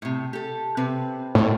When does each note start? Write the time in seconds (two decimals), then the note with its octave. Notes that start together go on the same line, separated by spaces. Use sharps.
0.02 A2 C3
0.33 G4 A4
0.77 C3 C4 B4
1.35 A2 A4 C#5